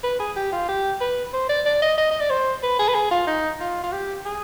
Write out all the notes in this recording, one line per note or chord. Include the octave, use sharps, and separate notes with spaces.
B4
G#4
G4
F4
G4
B4
C5
D5
D5
D#5
D#5
D#5
D5
C5
B4
G#4
B4
G#4
F4
D#4
F4
F4
G4
G#4